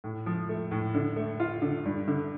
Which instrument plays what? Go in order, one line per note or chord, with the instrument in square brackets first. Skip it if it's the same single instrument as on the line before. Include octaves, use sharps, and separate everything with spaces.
[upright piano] A2
F3
A3
A2
D3
A3
F4
D3
G2
D3